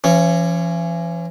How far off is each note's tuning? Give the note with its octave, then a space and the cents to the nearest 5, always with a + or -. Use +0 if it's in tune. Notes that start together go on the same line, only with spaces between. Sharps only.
E3 +45 C#4 +0